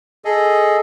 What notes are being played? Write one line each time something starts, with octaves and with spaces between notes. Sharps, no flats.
G#4 A4 D#5